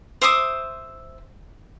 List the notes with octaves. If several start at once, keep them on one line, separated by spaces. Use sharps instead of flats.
C5 E5 D6 D#6